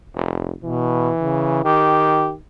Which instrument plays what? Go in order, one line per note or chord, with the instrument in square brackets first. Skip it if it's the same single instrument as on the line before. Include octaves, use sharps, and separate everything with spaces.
[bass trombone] F1
[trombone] B2 [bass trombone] E3
[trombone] C#3
[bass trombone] D#3 [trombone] G4